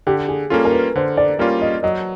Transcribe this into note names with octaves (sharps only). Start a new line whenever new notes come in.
D3 G4
G#4
G3 A#3 C#4 F4 A4
A#4
B4
D3 C5
D5
G3 A#3 C#4 F4 D5
D#5
F#3 D#5